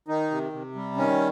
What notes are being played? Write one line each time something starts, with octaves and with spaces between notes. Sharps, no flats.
D#3 D#4
C3
C3
G3
D#3 C#4